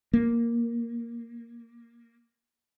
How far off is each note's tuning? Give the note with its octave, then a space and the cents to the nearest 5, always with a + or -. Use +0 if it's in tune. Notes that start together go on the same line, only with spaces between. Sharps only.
A#3 +5